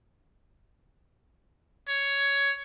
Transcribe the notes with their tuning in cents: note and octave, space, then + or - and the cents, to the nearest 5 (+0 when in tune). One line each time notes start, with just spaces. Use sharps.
C#5 +10